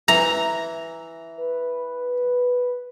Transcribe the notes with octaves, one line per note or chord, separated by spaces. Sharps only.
E3 A#5
B4